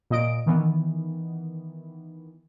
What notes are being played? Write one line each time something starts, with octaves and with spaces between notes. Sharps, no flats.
A#2 D#5 D7
D#3 E3 B3